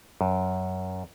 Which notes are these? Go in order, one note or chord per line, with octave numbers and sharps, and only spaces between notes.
F#2